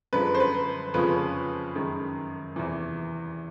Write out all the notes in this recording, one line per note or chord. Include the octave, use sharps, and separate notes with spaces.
F#2 D3 F3 G#3 B4
C5
B4
F2 C#3 F3 G#3 C#4 B4
F#2 D#3 G#3
E2 C3 E3